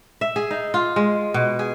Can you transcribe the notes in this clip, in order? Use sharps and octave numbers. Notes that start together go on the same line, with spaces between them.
E5
G#4
D#4
F4
G#3
B2
G#4